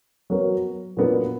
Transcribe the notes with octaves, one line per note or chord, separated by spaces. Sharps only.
F#3 B3 F#4 A#4 C#5
A#2 F#3 B3 D4 A#4